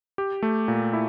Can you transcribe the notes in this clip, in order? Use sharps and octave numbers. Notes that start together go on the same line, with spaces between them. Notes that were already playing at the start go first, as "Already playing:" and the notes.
G4
A3
A#2
E4